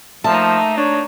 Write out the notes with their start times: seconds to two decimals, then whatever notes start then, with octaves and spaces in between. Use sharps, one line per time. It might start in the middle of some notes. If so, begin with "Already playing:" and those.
0.24 F3 A3 A#3 D#4 E5 A5
0.77 D4 C#5